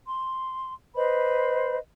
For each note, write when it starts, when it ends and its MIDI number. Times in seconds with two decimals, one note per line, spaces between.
0.08 0.74 84
0.95 1.78 71
0.95 1.78 72
0.95 1.78 75
0.95 1.78 83